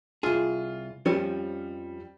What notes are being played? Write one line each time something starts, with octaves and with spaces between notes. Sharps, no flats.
C2 F4 G#4
F2 F3 G3 C#4